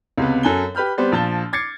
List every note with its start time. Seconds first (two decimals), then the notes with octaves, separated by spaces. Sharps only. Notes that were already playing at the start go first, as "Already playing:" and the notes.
0.18 C#2 C3 B3
0.43 F#2 A4 G#5 F#6 G7
0.75 G4 B4 B5 F6 G6
0.98 G3 B3 C4 C5 D5
1.12 A#1 F3 A5 A6 G7
1.53 D6 G#6 A6 C7 C#7